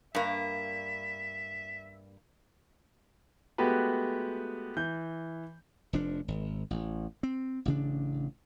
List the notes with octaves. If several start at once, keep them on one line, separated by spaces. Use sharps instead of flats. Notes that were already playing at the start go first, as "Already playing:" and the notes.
G2 A#3 E5
G#3 A3 B3 F#4 G4 B4
E3 G6
F1 F3 D4
G#1
A1
C4
A1 C#3 D4